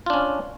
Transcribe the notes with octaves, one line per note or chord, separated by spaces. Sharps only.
C#4 D4 F4